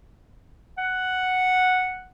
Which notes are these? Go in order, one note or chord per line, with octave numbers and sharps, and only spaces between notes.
F#5